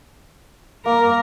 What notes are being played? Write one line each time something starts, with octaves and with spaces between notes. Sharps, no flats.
A#3 A#4